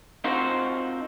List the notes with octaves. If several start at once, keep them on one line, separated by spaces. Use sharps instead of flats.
C4 D#4 F4 F#4 A#4 C5